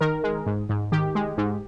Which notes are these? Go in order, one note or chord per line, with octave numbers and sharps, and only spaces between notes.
D#3 A#4
G#3
G#2
G#2
D#3 G4
G#3
G#2